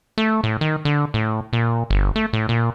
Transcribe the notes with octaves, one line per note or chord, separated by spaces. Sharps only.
A3
A2
D#3
D3
A2
A#2
G1
A3
A2
A#2